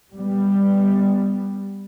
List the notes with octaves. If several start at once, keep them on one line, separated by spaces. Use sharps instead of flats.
G3 B3